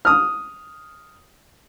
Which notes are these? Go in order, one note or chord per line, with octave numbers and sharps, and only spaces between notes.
D#6 F6